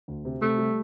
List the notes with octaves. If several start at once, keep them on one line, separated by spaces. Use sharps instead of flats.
D2
C3
C3 A3
G3